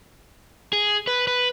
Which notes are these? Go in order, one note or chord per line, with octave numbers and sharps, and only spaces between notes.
G#4
B4
B4